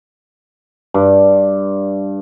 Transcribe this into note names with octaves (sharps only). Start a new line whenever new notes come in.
G2